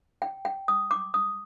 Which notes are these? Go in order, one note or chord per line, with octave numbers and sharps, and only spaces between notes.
G5
G5
D#6
D6
D#6